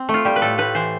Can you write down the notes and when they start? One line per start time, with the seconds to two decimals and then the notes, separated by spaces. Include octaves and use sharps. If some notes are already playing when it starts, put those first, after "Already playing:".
Already playing: C4
0.09 A3
0.14 F4
0.25 G3 G4
0.36 B4
0.42 A2 A4
0.58 A2 B4
0.75 E3 C5